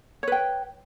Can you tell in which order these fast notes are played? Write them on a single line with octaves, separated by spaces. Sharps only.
C#5 B4 G5